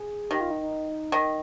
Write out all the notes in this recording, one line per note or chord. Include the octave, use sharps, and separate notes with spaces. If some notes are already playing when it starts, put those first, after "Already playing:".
Already playing: G#4
D#3 G4
F4
D#4
D#4
D#3